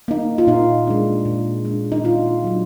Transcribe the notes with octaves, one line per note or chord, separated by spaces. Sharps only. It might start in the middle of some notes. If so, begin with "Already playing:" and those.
A#3 D#4
F4
A#2 D#4
G#3 D4
A#2
G#3 D4
D#4
A#2 F4
F#3 D4